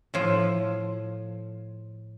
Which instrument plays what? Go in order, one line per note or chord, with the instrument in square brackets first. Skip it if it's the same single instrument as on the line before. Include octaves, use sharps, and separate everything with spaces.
[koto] A2 F3